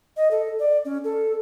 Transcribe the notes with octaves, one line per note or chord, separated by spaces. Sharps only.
D#5
A4
D5
C#4
A4